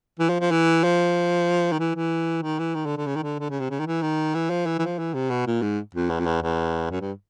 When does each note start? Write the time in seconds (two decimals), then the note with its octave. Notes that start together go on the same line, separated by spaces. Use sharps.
0.19 E3
0.29 F3
0.40 F3
0.51 E3
0.84 F3
1.72 D#3
1.79 E3
1.95 E3
2.42 D#3
2.59 E3
2.74 D#3
2.86 D3
2.97 D3
3.06 C#3
3.16 D#3
3.23 D3
3.39 D3
3.50 C#3
3.60 C3
3.70 C#3
3.80 D#3
3.86 E3
4.02 D#3
4.35 E3
4.50 F3
4.66 E3
4.79 E3
4.82 F3
4.99 E3
5.14 C3
5.30 B2
5.47 A#2
5.62 G#2
5.95 F2
6.10 E2
6.20 F2
6.26 E2
6.43 E2
6.91 F#2
7.01 G2